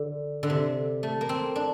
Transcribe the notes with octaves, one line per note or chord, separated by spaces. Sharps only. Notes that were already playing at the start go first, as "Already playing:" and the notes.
Already playing: D3
D3
C3
A3
A#3
C4
D4